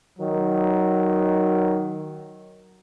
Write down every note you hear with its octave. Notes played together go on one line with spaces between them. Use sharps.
D#3 F#3